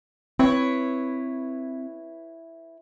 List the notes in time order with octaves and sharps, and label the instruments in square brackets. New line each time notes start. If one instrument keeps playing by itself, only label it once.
[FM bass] C4 [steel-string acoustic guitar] E4 B4 C#5